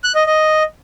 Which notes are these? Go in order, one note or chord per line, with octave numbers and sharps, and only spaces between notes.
F#6
D#5
D#5